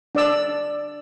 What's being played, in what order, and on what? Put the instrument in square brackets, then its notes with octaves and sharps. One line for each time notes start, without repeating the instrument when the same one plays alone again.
[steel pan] D4 D5 E6